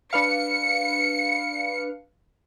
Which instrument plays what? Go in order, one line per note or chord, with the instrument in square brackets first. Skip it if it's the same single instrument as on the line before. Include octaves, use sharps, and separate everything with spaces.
[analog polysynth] D4 B4 F5 [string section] C#7